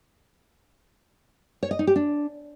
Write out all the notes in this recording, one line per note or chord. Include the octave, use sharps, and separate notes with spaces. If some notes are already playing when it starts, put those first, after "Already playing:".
C#5
D#5
D#4
G4
D4